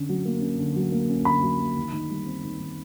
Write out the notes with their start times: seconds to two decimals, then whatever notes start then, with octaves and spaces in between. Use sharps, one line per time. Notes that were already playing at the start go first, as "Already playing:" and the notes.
Already playing: D3 C#4
0.09 F#3
0.25 A#3
0.41 C#4
0.58 D3
0.76 F#3
0.92 A#3
1.09 C#4
1.25 D3 B5
1.42 F#3
1.59 A#3
1.77 D#3
1.93 D#3
2.10 G3
2.26 C4
2.43 D#3
2.60 D#3